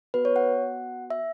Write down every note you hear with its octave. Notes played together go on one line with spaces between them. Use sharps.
B3 F#4 B4
C#5
F#5
E5